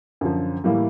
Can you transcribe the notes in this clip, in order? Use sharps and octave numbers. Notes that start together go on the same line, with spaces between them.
F#2 D3 F3
A2 E3 G3 A#3